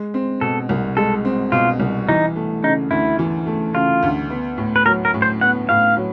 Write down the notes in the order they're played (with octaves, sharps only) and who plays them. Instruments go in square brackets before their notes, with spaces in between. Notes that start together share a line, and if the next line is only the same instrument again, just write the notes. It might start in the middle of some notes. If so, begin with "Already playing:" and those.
Already playing: [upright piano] G#3
C4
[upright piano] B2 [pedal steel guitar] A4
[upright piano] C2
[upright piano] G#3 [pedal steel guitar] A4
[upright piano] C4
[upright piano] B2 [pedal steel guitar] F4
[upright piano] C2
[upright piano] E3 [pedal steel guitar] D#4
[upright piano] A3
[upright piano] C#3 [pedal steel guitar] D#4
[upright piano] D2 [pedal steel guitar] E4
[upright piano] E3
A3
[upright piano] C#3 [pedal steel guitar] F4
[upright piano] D2
B3
A2
[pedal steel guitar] B4
[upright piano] F#3 [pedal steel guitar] A#4
[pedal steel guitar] A#4
[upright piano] A2
[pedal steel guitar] C5
[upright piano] B3 [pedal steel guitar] F#5
[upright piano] A2 [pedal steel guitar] F5
[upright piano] F#3